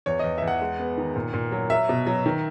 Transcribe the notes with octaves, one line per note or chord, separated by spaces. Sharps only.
E2 C#5
E2 D#5
E5
E2
F#5
G#3
B3
D#3
A#2
A#2
F#3
F#3 E5
B2
F#3
D#3